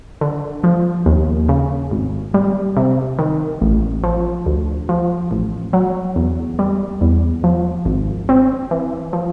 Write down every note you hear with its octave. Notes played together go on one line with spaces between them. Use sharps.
D3
F3
D#2
C#3
G#1
G3
C3
D#3
A1
F3
D2
F3
A1
F#3
E2
G3
E2
F3
G#1
C4
E3
F3